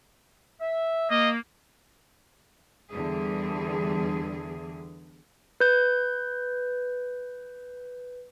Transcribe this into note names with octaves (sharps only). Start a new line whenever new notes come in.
E5
A#3 D#5
E2 D3 E3 G3 G#4
B4 G6